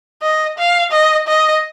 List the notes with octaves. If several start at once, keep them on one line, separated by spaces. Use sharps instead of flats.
D#5
F5
D#5
D#5